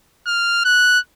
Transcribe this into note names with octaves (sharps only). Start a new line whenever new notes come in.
F6
F#6